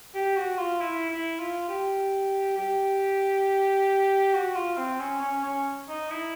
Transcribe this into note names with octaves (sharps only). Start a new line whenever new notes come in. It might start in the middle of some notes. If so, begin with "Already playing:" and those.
G4
F#4
F4
E4
E4
F4
G4
G4
F#4
F4
C4
C#4
C#4
C#4
D#4
E4